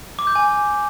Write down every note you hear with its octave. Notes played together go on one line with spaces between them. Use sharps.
D6
G6
G#5